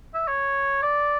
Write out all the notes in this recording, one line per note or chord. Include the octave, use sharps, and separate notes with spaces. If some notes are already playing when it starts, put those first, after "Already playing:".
E5
C#5
D5